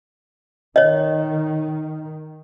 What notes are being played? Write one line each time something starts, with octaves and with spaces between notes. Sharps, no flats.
D#3 C#5 D#5